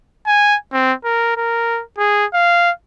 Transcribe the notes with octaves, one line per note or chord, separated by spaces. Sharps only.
G#5
C4
A#4
A#4
G#4
F5